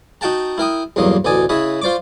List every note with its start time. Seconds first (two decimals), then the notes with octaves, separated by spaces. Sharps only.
0.21 D#4 F#4 F#5 G5 A5 A#5
0.58 E4 A#4 G5 D#6
0.96 B1 E2 G2 F#3 A#3 D#5
1.25 A1 D2 B2 D5 G#5 D#6
1.49 C#3 E4 C#5 D#5 B5
1.82 F4 C5 D5 C#6 D6